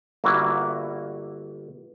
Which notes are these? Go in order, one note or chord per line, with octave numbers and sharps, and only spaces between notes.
G1 A#3 E4 F#4